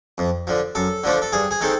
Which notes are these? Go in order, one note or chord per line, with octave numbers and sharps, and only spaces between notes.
F2
D3 F3
F#2 A4
D3 F3 A3 D4
A4
G2 G#4
G#4
D#3 G#3 C4 A4